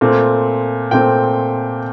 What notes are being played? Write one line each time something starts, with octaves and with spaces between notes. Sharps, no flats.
A#2 A3 C4
A#2 A3 C4 G5